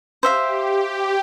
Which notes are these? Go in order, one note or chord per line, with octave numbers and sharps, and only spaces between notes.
G4 C5 E5 F5